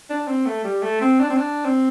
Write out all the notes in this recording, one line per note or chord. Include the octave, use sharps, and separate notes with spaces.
D4
C4
A3
G3
A3
C4
D4
C4
D4
C4